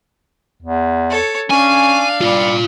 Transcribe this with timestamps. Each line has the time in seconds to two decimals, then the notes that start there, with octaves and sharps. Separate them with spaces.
0.62 E2
1.10 A4 C#5
1.50 C#4 D4 F5 G#5
2.21 G3 F4 D5